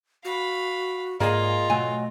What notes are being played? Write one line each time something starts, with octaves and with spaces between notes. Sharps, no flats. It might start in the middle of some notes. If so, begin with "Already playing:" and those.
F#4 F5 B5
G#2 A#3 F4 G#4 D5 D#5 G#5
B2 F#3 A3 G#5